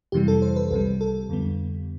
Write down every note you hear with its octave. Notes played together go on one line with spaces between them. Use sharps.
F2 C3 E3 G3 G4
A4
C5
B4
C2 C3 G3 A4
A4
F2 D3 G3 B3